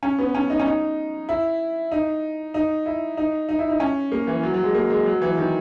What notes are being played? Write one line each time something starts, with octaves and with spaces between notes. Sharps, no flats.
C#4
B3
C#4
D#4
C#4
D#4
E4
D#4
D#4
E4
D#4
D#4
E4
D#4
C#4
A#3
E3
F#3
F#3
G#3
A#3
G#3
F#3
E3
D#3